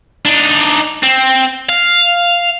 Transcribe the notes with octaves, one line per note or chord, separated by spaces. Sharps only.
D4 D#4
C4
F5